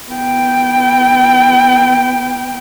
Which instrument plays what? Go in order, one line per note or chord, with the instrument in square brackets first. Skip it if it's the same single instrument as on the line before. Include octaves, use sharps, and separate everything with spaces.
[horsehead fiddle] B3 G5